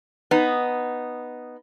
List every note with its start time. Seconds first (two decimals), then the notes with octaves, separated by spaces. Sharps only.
0.31 B3 D#4